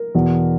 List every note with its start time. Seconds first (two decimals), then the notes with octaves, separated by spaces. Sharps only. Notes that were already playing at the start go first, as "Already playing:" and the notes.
Already playing: A#4
0.15 E2 B2